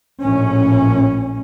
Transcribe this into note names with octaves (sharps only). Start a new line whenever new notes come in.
A#1 A2 C#4